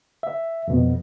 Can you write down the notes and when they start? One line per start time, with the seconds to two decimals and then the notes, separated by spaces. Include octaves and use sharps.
0.23 E5
0.68 F2 B2